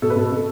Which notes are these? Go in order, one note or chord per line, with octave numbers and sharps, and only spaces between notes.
B2 A4
B4
B2 A4
B2